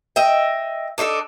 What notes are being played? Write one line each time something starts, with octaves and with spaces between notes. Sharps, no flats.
D#5 E5 G5
D4 D#4 F4 A4